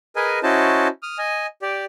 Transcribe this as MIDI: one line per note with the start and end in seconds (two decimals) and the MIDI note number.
0.16 0.39 68
0.16 0.39 70
0.16 0.39 71
0.16 0.39 75
0.16 0.39 80
0.43 0.88 61
0.43 0.88 64
0.43 0.88 66
0.43 0.88 72
0.43 0.88 75
0.43 0.88 81
1.03 1.18 87
1.03 1.18 89
1.18 1.46 75
1.18 1.46 80
1.62 1.85 67
1.62 1.85 74